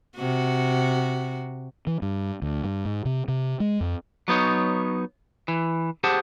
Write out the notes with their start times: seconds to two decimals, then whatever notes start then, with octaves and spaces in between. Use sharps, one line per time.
0.17 C3 F#4
1.87 E3
2.02 G2
2.42 D2
2.63 G2
2.85 G#2
3.05 C3
3.28 C3
3.60 G#3
3.81 F2
4.28 F#3 B3 D#4 C#5
5.48 E3
6.04 G4 G#4 C5 F#5 A5